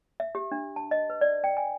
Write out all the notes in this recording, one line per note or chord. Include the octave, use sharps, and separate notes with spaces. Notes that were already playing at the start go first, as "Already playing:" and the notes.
E5
G4
D4
A5
D#5
B4
D5
G5
G#5